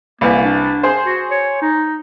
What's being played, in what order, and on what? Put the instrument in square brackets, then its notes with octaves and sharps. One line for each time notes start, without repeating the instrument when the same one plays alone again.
[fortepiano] C2 E3 [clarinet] A#3
[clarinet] D4
[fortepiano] G#4 C5
[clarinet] F#4
C#5
D#4